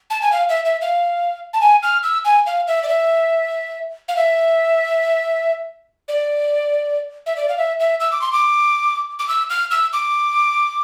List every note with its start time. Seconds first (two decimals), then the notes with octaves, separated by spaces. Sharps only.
0.10 A5
0.22 G#5
0.32 F5
0.49 E5
0.65 E5
0.81 F5
1.53 A5
1.61 G#5
1.83 F6
2.03 E6
2.25 G#5
2.46 F5
2.67 E5
2.83 D5
2.88 E5
4.08 F5
4.17 E5
6.08 D5
7.26 E5
7.37 D5
7.49 F5
7.58 E5
7.80 E5
8.00 E6
8.12 D6
8.21 C6
8.33 D6
9.19 D6
9.28 E6
9.50 F6
9.71 E6
9.93 D6